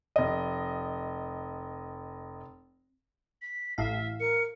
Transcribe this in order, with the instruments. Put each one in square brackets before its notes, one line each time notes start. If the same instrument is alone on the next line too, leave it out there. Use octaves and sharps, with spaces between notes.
[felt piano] F1 D#5
[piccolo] B6
[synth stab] A1 A2 F5 [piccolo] E5
[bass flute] A#4 [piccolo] C#7